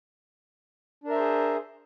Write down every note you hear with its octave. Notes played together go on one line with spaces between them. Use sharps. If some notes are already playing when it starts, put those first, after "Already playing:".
D4 G#4 A#4 C5 E5